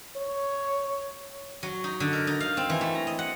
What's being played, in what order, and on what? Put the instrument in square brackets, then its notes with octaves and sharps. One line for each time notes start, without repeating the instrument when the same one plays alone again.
[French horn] C#5
[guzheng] F#3
D#4
D3
A#4
D#4
F5
C4
E3
A3
A#5
D#5
F#5